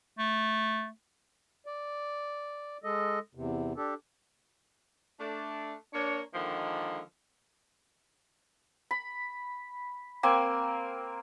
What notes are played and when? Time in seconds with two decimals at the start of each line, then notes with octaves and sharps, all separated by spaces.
0.18 A3
1.66 D5
2.84 G#3 A4 D#5
3.35 E2 C3
3.77 D4 G4 A4
5.20 A3 D4
5.94 A#3 D4 C#5
6.35 D3 D#3 F3 G#3 A#3
8.91 B5
10.23 A#3 C4 G#5